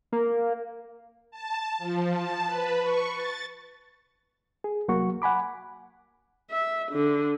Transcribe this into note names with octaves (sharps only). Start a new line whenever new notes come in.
A#3
A5
F3
A5
B4
C#6
A6
G#4
C2 F#3 A#3 F#4 C#6
F#5 G#5 B5 D6
E5
D3